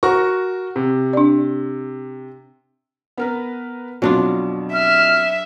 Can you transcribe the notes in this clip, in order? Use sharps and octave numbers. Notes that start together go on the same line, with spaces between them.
F#4 A#4 C#6
C3
D4 D5
B3 A#4 B4
F2 B2 F#3 D4 F4
E5 F6